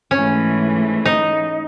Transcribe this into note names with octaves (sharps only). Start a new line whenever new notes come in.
G#2 E3 A3 C#4
D#4